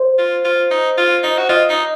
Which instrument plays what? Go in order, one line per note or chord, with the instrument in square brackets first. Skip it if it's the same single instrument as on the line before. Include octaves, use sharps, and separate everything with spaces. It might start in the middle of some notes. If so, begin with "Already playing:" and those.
Already playing: [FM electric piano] C5
[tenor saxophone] F4
F4
D#4
F4
D#4
F#4
[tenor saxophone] F4 [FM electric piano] D#5
[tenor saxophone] D#4